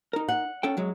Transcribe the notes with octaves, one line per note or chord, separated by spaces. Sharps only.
D#4 A#4
F#5
C#4 A4 G5
F#2 F#3 G#3